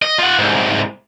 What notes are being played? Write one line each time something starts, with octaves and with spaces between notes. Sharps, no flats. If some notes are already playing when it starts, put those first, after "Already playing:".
D#5
F4 F#5
C2 G#2